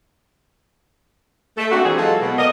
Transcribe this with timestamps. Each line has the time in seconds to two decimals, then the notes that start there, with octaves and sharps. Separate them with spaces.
1.57 A3
1.71 A#3 C4 D4 F#4
1.84 C3 E3 C4 G#4
1.97 E3 F#3 G#3 C4 F4 A4
2.21 B2
2.38 A#3 A#4 D5 D#5